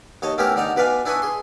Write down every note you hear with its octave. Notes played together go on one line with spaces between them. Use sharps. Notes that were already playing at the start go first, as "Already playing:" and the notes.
D#2 C#5 D#5 A5
A3 B3 C#4 E4 G4 A#4
D3 D#4 D5 A#5
B2 B4 D5 F5 G#5
D4 E4 B4 G#5 C#6 D#6
G#4 C6